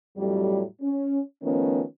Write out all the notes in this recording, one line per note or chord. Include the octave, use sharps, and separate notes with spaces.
F2 A2 F#3 G3
C#4
D#3 F3 A3 B3 C#4